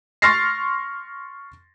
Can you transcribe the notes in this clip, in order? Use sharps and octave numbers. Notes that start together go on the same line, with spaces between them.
C6 C#6 F6 A6 A#6 C7